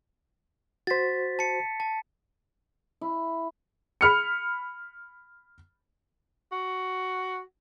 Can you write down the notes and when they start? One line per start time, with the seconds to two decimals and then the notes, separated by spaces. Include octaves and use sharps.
0.87 F#4 C5 A6 B6
1.39 A5 C#7
1.80 A5
3.01 E4
4.01 B5 F6 C#7
6.52 F#4